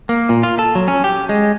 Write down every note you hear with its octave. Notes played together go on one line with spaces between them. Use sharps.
A#3
A#2
F4
A4
F#3
C#4
G4
G#3